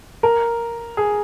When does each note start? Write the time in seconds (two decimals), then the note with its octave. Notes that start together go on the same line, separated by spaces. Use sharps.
0.23 A#4
0.97 G#4